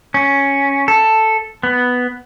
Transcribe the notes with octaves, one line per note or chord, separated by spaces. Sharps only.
C#4
A4
B3